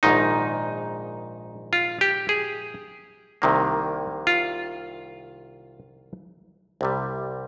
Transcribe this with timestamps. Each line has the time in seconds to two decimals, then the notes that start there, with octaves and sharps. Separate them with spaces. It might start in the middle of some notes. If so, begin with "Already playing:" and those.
0.03 A#1 G#2 D#3 D#4
1.73 F4
2.01 G4
2.29 G#4
3.42 C2 C3 D#3 A#3
4.27 F4
6.81 C2 C3 G3